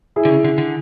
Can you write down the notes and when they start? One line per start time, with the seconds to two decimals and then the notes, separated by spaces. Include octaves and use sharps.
0.16 E4 G#4
0.25 D3
0.30 C#3
0.44 D3
0.58 D3